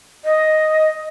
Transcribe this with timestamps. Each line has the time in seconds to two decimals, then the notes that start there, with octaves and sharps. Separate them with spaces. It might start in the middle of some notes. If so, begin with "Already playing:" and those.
0.25 D#5